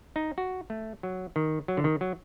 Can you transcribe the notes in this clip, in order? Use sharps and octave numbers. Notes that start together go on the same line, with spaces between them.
D#4
F#4
A3
F#3
D#3
F#3
D3
D#3
F#3